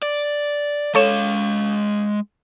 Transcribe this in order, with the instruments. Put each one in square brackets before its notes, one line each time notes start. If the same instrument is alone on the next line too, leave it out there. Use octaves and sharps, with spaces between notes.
[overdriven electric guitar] D5
[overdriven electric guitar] G#3 F5 [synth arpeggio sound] A4 C#5 E7